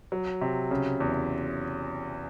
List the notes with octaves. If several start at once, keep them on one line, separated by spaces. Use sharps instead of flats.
F#3
C3
C#3
E2